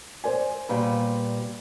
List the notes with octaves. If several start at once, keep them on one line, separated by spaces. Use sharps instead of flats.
C5 D5 G#5
A#2 G3 B4